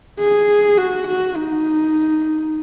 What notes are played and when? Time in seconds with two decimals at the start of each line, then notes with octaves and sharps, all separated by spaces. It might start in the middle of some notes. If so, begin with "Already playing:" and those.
0.20 G#4
0.78 F#4
1.08 F#4
1.37 D#4